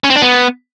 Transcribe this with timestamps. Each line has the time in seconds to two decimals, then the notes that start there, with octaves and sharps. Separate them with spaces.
0.04 C#4
0.10 C4
0.16 D4
0.22 B3